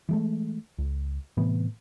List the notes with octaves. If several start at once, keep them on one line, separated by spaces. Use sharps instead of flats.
E3 G#3 A3
C#2
A2 C3 E3 B3